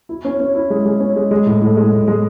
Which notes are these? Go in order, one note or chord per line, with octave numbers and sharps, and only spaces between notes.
E4
C#4
C#4
E4
G#3
G#3
C#4
G#3
G#3
A2
A2
G#3
A2
G#3